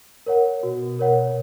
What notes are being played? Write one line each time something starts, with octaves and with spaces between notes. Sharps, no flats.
A#4 C#5 F#5
B2 F#4
A#4 C#5 F#5